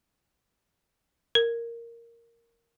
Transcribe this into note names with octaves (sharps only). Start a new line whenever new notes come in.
A#4